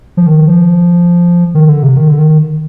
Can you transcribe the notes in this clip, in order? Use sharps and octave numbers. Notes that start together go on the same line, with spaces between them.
F3
D#3
F3
D#3
D3
C3
D#3
D3
D#3